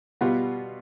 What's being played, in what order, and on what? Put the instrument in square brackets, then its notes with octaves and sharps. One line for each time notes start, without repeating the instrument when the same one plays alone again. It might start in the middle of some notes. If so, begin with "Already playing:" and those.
[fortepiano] B2 G3 B3 F4